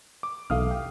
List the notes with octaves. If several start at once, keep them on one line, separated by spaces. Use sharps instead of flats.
D6
B1 E2 A3 F5 D#6 F6
G4